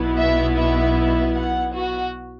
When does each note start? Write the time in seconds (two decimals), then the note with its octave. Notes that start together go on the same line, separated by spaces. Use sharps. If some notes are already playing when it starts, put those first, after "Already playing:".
Already playing: B1 B2 B3 E4
0.18 E5
0.57 E5
0.96 E5
1.36 F#5
1.75 F#4